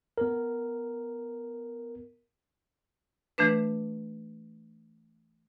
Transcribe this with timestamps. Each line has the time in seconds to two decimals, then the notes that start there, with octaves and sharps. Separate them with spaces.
0.18 B3 A#4
3.38 E3 A3 D4 B4